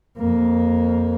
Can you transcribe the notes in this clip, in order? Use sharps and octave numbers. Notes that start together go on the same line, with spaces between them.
F2 A#3